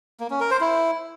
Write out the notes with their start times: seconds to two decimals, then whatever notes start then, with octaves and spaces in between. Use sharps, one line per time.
0.20 A#3
0.30 C#4
0.40 A#4
0.51 C5
0.61 E4